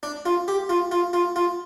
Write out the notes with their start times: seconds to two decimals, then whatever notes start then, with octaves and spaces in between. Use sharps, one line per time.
0.03 D4
0.26 F4
0.48 G4
0.69 F4
0.91 F4
1.13 F4
1.36 F4